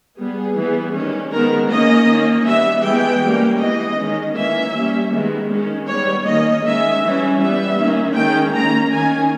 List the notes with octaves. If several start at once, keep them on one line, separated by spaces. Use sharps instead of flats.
G3 B3 G#4
E3 G3 B3
D#3 G3 C#4
D#3 G#3 B3 A#4
D#3 A#3 C#4 D#5
D#3 A#3 C#4
G3 B3 E5
E3 G#3 B3 G5
G3 A#3 C#4
E3 G#3 B3 D#5
D#3 G#3 C#4
E3 A#3 C#4 E5
G3 A#3 C#4
D#3 G#3 B3
D#3 G#3 C#4
G3 B3 C#5
D#3 A#3 C#4 D#5
D#3 G#3 C#4 E5
E3 G3 C#4
G3 B3 E5
D#3 A#3 C#4
D#3 G#3 C#4 G5
D#3 A#3 C#4 A#5
D#3 A#3 C#4 G#5